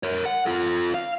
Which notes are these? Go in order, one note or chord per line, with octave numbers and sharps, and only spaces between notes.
A#4 C#5
F#5
F4 A4
F5